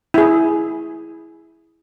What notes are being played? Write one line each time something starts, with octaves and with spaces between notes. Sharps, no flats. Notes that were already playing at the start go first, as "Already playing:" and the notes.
E4 G#4